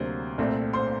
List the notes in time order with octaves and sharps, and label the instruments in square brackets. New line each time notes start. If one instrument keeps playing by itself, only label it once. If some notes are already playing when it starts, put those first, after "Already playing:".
Already playing: [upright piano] D2 C3 F#3 A#3 D4 C5
C2 A#2 A3 C4
C5 C6